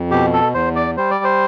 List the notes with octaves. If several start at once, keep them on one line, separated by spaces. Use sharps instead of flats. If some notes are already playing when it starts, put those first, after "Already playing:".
Already playing: F2
B2 G4
A4
E2 C5
D5
G3 C5
D5
C5